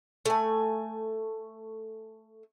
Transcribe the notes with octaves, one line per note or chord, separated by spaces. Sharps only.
A3 G#5